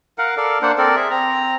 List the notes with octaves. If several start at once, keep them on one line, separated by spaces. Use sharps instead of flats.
A#4 F5 F#5
A4 A#4 D5 F5
A#3 D4 C5 F#5
C4 A4 A#4 D5
G#4 E5
C4 A#5